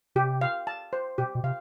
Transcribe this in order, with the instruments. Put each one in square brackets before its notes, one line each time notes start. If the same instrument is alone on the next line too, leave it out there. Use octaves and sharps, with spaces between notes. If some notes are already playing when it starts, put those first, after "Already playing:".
[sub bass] C3 [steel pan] G4
[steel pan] F5
A5
C5
[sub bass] B2 [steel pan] G4
[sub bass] B2
[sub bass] C3 [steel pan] F5